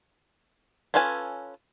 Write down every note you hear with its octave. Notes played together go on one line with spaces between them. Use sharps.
C#4 F4 A4 B4 G#5